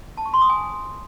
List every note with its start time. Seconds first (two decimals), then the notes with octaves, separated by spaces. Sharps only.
0.17 A5
0.25 C#6
0.34 C6
0.42 D#6
0.50 G#5